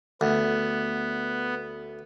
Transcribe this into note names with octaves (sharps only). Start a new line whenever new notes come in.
D2 B3